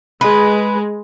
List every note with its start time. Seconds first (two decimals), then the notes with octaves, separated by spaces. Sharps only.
0.21 G#3 B4